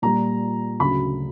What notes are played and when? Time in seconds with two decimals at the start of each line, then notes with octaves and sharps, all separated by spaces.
0.02 A#2 G3 A#5
0.80 D2 C#3 F#3 B5